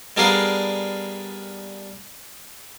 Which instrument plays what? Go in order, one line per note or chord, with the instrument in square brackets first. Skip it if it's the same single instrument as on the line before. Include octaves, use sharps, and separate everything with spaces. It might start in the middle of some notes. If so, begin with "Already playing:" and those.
[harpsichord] G3 B3 D4 G#4 A#4 F5